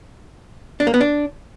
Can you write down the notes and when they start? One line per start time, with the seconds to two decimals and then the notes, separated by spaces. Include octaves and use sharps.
0.80 D4
0.87 A#3
0.94 B3
1.01 D4